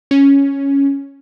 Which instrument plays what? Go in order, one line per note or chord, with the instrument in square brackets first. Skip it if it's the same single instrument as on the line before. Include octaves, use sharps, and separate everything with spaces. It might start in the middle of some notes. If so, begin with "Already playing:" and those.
[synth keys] C#4